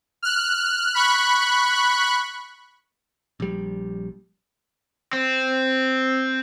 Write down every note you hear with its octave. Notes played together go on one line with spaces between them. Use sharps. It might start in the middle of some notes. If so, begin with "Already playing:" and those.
F6 F#6
B5 C#6 F#6
A#1 G3
C4